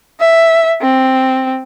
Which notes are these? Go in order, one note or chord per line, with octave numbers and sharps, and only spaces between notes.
E5
C4